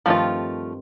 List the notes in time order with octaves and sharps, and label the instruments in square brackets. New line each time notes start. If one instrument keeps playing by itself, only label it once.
[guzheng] G2 D#3 C4 [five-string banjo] F3 A3 F4